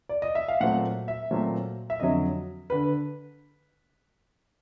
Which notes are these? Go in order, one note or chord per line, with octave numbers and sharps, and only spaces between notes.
D5
D#5
E5
F5
A#2 F#3 A3 C4 F#5
E5
A#2 F#3 A3 C4
E5
F2 D3 F#3 D#5
D3 B4